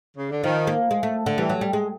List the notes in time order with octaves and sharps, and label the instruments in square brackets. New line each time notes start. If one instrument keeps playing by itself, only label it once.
[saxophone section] C#3
D3
[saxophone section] D#3 [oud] F3
[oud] A#3
G#3
A3
D3
[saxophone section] E3 [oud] G3
[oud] F#3
G3
G#3